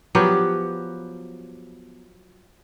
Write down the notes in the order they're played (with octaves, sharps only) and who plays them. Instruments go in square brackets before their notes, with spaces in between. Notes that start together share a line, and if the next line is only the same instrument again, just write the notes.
[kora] F3 F#3 B3 G4